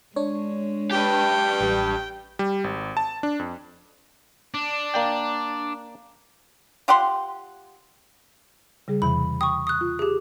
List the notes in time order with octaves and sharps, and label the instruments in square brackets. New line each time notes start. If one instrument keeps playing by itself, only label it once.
[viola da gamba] G#3 [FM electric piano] D4 C#5
[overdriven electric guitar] G4 B4 [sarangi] G5
[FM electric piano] A1 G3
[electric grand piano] G3
G#1
A5
D4
F2
[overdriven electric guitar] D4
[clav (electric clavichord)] A#3 D5 G5
[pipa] F4 G4 F#5 C6
[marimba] C#3 G3 G#4
[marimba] E2 C3 E3 [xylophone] B5
[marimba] G5 [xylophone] C#6 D#6
[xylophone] D#6 F#6
[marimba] F4
[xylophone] G4 G#4